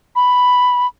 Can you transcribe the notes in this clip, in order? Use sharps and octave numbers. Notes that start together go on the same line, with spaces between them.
B5